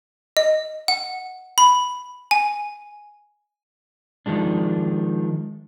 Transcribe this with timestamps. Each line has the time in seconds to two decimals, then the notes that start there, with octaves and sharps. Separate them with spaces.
0.37 D#5
0.88 F#5
1.58 B5
2.31 G#5
4.26 D#3 F3 G#3 D4